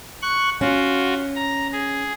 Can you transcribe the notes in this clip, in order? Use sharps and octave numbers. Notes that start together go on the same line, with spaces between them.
C#6 F#6
C#4 F4 F#4
A#5
G#4